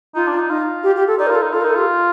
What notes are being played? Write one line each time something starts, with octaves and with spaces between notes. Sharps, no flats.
D#4 F4
D4
D#4
D#4 F4
G4
G4
A4
D#4 D5
A#4
F4
A4
D#4
F4 A4
A#4
D#4
A4
F4 G4